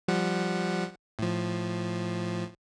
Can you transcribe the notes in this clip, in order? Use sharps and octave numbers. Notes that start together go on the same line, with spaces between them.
F3 G3 F#5
A2 F3